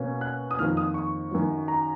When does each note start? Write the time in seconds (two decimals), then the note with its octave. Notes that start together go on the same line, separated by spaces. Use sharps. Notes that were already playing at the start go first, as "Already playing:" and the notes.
Already playing: B2 A#3 C#4
0.21 F#6
0.51 D#6
0.58 F2 D#3 A#3 F6
0.77 D#6
0.94 C#6
1.31 F#2 D#3 F#3
1.68 A#5